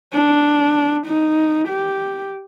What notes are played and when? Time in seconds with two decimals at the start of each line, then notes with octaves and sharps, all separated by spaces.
0.13 D4
1.06 D#4
1.68 G4